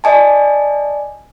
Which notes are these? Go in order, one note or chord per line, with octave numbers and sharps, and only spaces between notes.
D5 D#5 G#5 A5